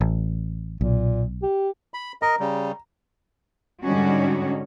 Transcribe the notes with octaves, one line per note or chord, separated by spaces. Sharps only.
A1
B1 A#2
G4
B5
A#4 D#5 A#5
C#3 G3
G#2 D3 G3 C#4 D#4 F#4